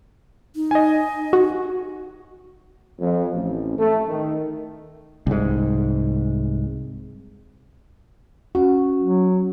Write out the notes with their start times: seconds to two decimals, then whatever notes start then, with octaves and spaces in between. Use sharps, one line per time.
0.56 D#4
0.71 D#5 G#5
1.33 F#4
3.00 F2
3.34 A1
3.77 A3
4.08 D#3
5.27 C2 G#2
8.55 C#4 F#4
9.00 F#3